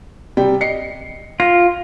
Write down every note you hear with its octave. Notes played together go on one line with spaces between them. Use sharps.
C3 G3 G5
D#5 C7 C#7
F4 A#6